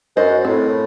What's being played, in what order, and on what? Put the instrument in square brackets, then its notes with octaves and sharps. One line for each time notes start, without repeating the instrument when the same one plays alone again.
[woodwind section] F#2 [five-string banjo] F#4 C5 D#5
[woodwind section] A2 [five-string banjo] C4